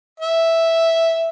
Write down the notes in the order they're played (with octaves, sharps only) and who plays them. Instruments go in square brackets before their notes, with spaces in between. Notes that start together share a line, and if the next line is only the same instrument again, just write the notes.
[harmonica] E5